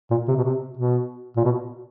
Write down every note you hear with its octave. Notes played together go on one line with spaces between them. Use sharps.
A#2
C3
B2
C3
B2
A#2
B2